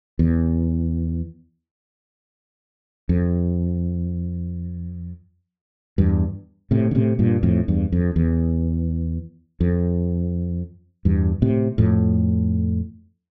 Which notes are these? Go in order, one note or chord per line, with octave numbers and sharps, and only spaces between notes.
E2
F2
E2 G2
A2 C3
D3
A2 C3
G2 A#2
F2 A2
E2 G2
F2
E2
F2
E2 G2
A2 C3
F2 A2